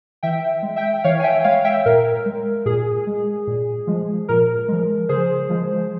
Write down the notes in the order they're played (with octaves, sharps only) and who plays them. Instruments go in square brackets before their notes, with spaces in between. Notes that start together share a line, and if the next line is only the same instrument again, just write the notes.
[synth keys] E3 E5 G5
G#3
E5 G5
E3 C#5 F5
G#5
E5 G5
G#3 C#5 F5
E5 G5
A#2 A#4
G#3
A#2 G#4
G#3
A#2
F3 G#3
A#2 A#4
F3 G#3
C#3 G#4 C5
F3 G#3